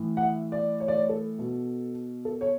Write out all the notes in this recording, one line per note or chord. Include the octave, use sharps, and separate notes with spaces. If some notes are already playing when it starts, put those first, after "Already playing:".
Already playing: A2 E3
F#5
E5
D5
C#5
D5
C#5
A4
B2
A4
C#5